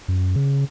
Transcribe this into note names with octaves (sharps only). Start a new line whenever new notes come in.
F#2
C#3